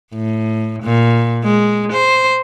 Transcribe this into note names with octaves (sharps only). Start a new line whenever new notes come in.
A2
A#2
G#3
C5